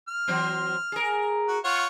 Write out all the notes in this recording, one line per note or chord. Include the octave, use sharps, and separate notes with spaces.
F6
E3 F#3 C4
G#4 A#4
F#4
F4 C#5 F#5